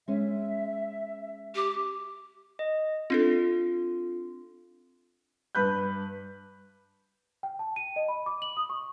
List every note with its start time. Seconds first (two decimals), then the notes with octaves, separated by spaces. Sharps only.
0.08 G#3 C#4 E5
1.55 G4
2.59 D#5
3.10 C4 D4 F4 A4
5.55 G2 B4 B5 F#6 G6
7.43 G5
7.59 A5
7.76 D#7
7.96 D#5
8.08 B5
8.26 D6
8.42 F#7
8.57 D#6
8.70 C#6